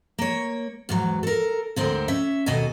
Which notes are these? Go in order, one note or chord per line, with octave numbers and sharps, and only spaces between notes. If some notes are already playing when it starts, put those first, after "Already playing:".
A#3 C#5
E2 G#2 F#3
A4 A#4
D2 G#2 D3 C4 A#4 C5
C#4 E5
D#2 B2 A4 D#5 G#5